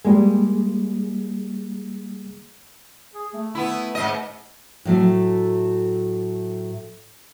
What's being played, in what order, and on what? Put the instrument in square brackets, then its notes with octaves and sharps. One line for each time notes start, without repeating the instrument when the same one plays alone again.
[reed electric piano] G3 A#3 G#4 [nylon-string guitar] G#3
[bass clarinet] G#4
A3
[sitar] B3 E4
G#2 D#5
[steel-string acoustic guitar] A2 F#3 A3